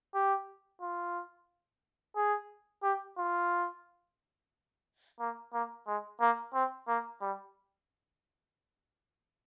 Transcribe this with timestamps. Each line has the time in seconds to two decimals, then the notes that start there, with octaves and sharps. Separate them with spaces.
0.15 G4
0.82 F4
2.16 G#4
2.83 G4
3.18 F4
5.20 A#3
5.53 A#3
5.87 G#3
6.21 A#3
6.54 C4
6.88 A#3
7.21 G3